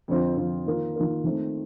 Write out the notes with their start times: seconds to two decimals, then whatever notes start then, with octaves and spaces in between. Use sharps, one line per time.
0.08 F2 D3 F3 C4 F4
0.37 F2 D3 F3 C4 F4
0.66 D#3 A#3 F4 A#4
0.96 D#3 A#3 F4 A#4
1.24 D#3 A3 C4